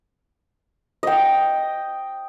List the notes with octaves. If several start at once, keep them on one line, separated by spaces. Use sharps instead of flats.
D#5 G5